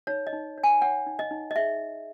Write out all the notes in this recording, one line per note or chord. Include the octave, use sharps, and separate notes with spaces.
D#4 C#5
D#5
D#4
C#5
G#5
C#5 F#5
D#4
D#5
D#4
D#5
G#4 E5